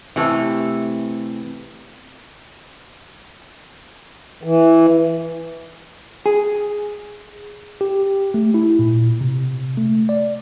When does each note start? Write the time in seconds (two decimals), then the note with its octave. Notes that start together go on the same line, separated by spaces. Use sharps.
0.16 C3 E3 A3 A4
4.43 E3
6.26 G#4
7.81 G4
8.34 A3
8.54 E4
8.79 A#2
9.21 C3
9.77 A3
10.09 D5